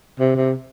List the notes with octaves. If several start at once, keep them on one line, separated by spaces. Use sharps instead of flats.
C3
C3